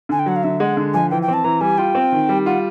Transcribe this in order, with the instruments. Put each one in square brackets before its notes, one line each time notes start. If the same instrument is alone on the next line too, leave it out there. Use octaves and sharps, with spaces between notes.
[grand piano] D3 [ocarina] G#5
[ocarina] G5
[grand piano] F#3 [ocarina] F#5
[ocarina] F5
[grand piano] D3 [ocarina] E5
[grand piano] G#3 [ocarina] F#5
[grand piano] D3
[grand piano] F3 [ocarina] G#5
[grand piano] E3 [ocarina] G5
[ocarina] G5
[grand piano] C4
[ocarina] A5
[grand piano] E3 [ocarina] A#5
[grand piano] G3 [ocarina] G#5
[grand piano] F4 [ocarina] G5
[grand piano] C4
D#3
G3
[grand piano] F4 [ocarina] F#5